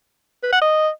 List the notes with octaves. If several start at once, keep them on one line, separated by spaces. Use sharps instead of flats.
B4
F#5
D#5